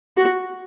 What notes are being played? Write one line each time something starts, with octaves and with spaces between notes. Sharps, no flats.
F#4